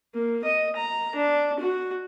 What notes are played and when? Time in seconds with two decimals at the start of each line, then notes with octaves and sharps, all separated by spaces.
0.15 A#3
0.44 D#5
0.76 A#5
1.16 D4
1.60 F#4